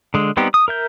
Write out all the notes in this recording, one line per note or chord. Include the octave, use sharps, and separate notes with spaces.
D3 G#3
G3 B3 C4 D#4 G4
D#6
A#4 E5 G6